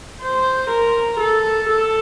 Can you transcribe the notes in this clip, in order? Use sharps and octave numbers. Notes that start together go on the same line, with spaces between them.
C5
A#4
A4
A4